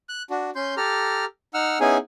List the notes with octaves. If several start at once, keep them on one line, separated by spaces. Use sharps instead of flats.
F#6
D4 F#4
C#4 C6 G6
G4 A4 A#5 F6
D#4 F#5 E6 F6
B3 C#4 D#4 E4 G#4 G#5